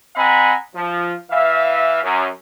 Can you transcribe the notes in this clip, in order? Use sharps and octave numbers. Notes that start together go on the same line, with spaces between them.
C4 D#5 F#5 G#5 A#5 B5
F3
E3 E5 F5
F#2